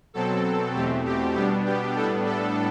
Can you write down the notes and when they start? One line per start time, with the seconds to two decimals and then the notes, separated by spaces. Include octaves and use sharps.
0.14 B2 F#3 C4 A4
0.74 E2 B2 A3 C4 G4
1.05 G4
1.34 B2 G3 B3 D4 G4
1.66 G4
1.96 A2 G3 B3 D4 A4
2.25 A4